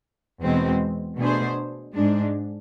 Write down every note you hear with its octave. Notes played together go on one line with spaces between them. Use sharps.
E2 B2 G#3 C4
B2 A3 D4 G#4 C5
G#2 G#3 D4